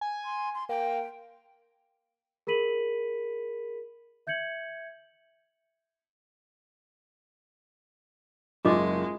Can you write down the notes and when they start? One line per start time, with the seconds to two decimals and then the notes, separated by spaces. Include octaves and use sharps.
0.01 G#5
0.25 C6
0.54 C6
0.69 A#3 G5
2.47 G#4 A#4 B5 B6 D#7 F#7
4.27 E5 G6 G#6 C#7 F#7
8.65 F#1 G#3 F4 D#5 D6